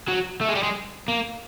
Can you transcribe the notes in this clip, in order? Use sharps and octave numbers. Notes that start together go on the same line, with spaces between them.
F#3
A3
G#3
G3
G#3
A#3